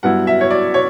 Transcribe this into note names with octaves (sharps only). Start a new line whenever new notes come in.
G2 F#3 B3 E4 F#5
E5
C#5
D5
C#5